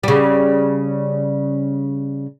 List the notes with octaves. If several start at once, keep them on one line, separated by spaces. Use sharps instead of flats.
C#3 G3